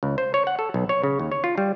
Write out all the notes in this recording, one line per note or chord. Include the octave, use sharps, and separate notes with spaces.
C#2
C5
C#5
F#5
A4
B1
C#5
C#3
D#2
C#5
F4
G3